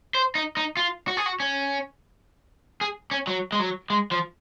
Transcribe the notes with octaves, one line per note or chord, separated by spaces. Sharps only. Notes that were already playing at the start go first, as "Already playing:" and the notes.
C5
D#4
D#4
F4
F#4
G#4
F#4
C#4
G#4
C#4
F#3
G#3
F#3
G#3
F3